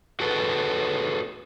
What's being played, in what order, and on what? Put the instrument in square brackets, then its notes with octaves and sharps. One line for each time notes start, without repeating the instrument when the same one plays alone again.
[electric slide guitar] F#4 G#4 A4 B4